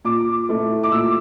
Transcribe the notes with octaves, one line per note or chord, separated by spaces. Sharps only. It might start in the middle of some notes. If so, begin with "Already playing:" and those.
A#2 D6
A3 E4
D6
A#2 E6